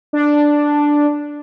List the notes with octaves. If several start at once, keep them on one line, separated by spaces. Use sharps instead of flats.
D4